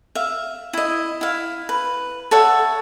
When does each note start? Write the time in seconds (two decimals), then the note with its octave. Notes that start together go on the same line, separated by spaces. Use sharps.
0.15 E5 F5
0.73 E4 D#5
1.21 E4 F5
1.69 B4
2.31 A4 C#5 E5 F#5